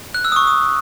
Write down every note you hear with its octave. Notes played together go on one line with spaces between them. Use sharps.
F#6
E6
D#6
C#6
D#6